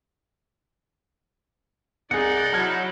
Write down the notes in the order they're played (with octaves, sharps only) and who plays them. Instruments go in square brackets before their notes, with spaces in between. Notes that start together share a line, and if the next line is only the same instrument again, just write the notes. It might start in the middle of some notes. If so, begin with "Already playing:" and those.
[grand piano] C2 G#4 [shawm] D#4 [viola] D5 [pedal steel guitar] F#5
[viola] F#3 E4 [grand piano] A5 F6 G#6